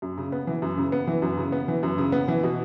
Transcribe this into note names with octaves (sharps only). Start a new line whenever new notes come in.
F#2
C#3
B3
E3
F#2
C#3
B3
E3
F#2
C#3
B3
E3
F#2
C#3
B3
E3
B2